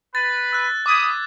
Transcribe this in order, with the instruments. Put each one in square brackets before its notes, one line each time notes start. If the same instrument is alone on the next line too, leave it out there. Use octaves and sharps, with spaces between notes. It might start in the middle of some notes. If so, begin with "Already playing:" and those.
[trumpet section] B4 [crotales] A6
[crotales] E6 F#6
[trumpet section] B5 D#6 [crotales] D6 G#6